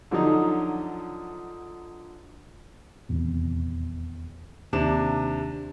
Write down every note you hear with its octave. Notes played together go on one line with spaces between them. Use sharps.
D3 F3 F#3 D#4
D#1 E2 C3
D#2 C3 D4 E7